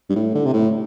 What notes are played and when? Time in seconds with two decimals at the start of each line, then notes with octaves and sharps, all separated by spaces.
0.09 G2
0.16 A2
0.35 D3
0.46 C3
0.54 A2